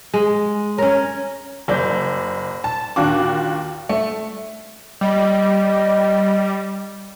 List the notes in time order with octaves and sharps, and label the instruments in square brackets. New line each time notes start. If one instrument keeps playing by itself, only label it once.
[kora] G#3
[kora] C#4 A#4 [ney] C#5
[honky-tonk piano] F#1 D5 G6
A5
D#2 A#2 D4 F4 F#4 D6
A3
[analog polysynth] G3 [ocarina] D#5